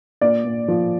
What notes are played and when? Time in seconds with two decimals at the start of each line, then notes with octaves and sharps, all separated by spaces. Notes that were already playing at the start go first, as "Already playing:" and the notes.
0.21 A#2 D5
0.45 A#2
0.68 F3